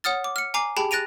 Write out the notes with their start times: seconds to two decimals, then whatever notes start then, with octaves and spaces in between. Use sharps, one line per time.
0.04 C#5 F#5 D#6 F6 A6
0.24 D6
0.36 F6 C#7
0.54 G#5 A#5 D6 C7
0.77 G4 G#4 G5 A5 B5
0.91 F#6 A6 A#6 D7 D#7 F7